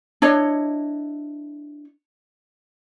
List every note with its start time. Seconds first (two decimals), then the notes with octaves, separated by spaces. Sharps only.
0.22 D4 E4 C#5 D#5